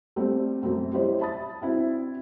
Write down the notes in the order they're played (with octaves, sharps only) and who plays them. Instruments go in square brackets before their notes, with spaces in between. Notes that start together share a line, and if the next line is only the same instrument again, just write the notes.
[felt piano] G3 A3 C4 D4
F#2 A3 C4
G3 C#4 E4 G4 C5 D#5
E5 A5 B5 D#6 A6
C4 D4 E4 F#4